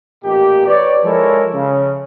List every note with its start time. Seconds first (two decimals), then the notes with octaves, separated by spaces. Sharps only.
0.24 A1 A#2 D#4 G4
0.66 B4 C#5 D5
1.04 F3 G#3 E4 A4 A#4 C#5
1.54 C#3